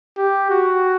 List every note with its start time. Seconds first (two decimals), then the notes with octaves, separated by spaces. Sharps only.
0.17 G4
0.50 F#4